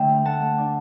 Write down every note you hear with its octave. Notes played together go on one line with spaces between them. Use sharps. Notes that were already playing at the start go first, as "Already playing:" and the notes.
Already playing: D3 A3 D4 E5 G5
D2
A3 F#5 A5
A3
D4